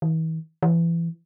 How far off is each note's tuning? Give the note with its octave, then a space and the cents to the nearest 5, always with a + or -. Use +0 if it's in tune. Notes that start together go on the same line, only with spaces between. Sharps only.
E3 -45
E3 +25